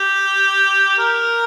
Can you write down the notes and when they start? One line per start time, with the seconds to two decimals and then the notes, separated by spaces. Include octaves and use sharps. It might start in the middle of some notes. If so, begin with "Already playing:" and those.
Already playing: G4
0.99 A#4